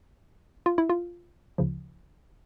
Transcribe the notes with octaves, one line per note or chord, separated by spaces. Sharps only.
F4
E4
F4
D2 C#3 F3